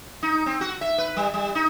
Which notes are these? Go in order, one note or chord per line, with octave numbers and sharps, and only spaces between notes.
D#4
C4
F#4
E5
B4
G3
G3
D#4